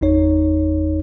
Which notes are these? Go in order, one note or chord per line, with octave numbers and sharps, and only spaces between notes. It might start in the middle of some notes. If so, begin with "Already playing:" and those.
G1 E2 D#4 C#5